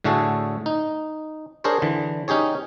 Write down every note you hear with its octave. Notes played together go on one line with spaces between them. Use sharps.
A2 D3 A3 F#4 G#4 A4
D#4
D4 G#4 A#4 C5 C#5
D3 E3
C#4 D#4 G4 G#4 C#5